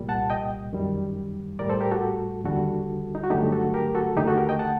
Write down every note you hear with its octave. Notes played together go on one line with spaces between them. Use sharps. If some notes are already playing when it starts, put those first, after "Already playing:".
Already playing: C2 A#2 G3
F#5 A5
D#5 G5
F#2 D#3 G3
A2 G3 A#4 D5
A4 C5
G4 A#4
F#4 A4
D#2 D3 G3 F#4 A4
D#4
F#4
G2 D3 F#3 A3 D#4 G4
F#4 A4
G4 A#4
F#4 A4
D#2 D3 A3 D#4 G4
F#4 A4
G4 A#4
D#5 G5
F#5 A5